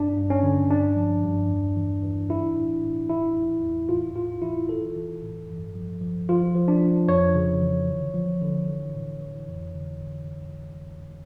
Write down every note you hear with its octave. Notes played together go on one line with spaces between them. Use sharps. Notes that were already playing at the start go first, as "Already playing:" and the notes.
Already playing: G2 D4
G2
C#4
D3
G2 D4
F3
G2
E2
E3
E3
E3 E4
A2
A2
E3 E4
E2
E2
A2 F4
A2 F4
E3 E4
E3 A4
E3
A2
G2
F3
F3
F3 F4
F3
D4
F3
F2 C#5
C#3
E3
D3
F3
D3
E3
A2
E3
F2
D3
D3